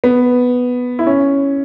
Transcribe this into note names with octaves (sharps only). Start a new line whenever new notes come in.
B3
E4
C#4